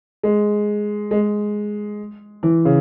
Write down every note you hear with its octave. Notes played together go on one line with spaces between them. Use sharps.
G#3
G#3
E3
C#3